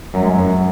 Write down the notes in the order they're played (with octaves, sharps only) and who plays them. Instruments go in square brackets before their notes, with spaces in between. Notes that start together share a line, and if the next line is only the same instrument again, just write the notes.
[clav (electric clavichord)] F#2 [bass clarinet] F#3
[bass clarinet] G#3
F#3
[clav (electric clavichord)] F#2